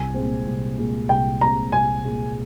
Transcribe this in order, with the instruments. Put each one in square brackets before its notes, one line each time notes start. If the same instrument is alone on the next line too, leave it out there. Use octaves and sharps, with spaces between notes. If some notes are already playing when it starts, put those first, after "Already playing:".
Already playing: [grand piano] C2 [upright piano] G#5
[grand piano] A#2 G#3 C4
C2
A#2 G#3 C4
[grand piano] C2 [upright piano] G5
[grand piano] A#2 G#3 C4 [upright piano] A#5
[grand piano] C2 [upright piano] G#5
[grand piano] A#2 G#3 C4